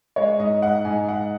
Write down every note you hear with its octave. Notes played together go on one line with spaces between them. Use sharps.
G#3 C#5
G#2 D#5
G#2 F#5
G#2 G#5
G#2 F#5